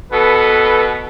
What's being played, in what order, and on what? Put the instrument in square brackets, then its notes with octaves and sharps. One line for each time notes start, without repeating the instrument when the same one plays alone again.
[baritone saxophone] B2 [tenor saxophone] A4 [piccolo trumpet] B4